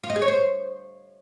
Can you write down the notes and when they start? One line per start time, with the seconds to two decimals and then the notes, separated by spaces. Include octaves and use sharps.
0.03 F4
0.10 D#5
0.16 G#4
0.22 C#5
0.28 C5